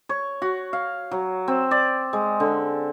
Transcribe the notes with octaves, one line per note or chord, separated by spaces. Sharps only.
C#5
F#4
F5
F#3
C4
D5
G#3
D3